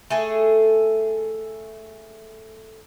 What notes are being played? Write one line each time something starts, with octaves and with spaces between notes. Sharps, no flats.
A3 G#4 A4